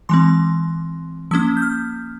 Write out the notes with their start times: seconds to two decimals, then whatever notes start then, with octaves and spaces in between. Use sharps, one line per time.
0.09 E3 G#3 C4 C6
1.31 F3 A#3 C#4 E6
1.57 G6
1.62 F6